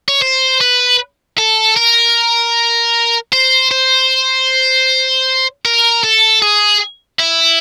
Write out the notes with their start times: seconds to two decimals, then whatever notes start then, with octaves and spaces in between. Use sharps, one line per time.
0.08 C#5
0.22 C5
0.61 B4
1.39 A4
1.77 A#4
3.32 C5
3.71 C5
5.65 A#4
6.04 A4
6.42 G#4
7.20 E4